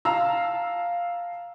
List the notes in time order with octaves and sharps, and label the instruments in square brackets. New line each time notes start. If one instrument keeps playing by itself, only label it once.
[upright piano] F5 A5 A#5 E6